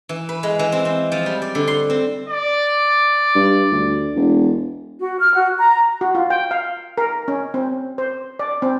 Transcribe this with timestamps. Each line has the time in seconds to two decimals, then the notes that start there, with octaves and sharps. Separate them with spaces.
0.09 E3
0.29 B4
0.43 G#3
0.59 E3
0.72 C4
0.85 C4
1.12 F3
1.26 G3
1.42 D5
1.55 D3
1.68 C6
1.90 C4
2.29 D5
3.35 G2
3.72 D2
4.16 E1
4.99 F#4
5.20 F6
5.34 F#4
5.57 A#5
6.01 F#4
6.15 F4
6.30 G5
6.51 F5
6.98 A#4
7.28 C#4
7.54 C4
7.98 C5
8.39 D5
8.62 C4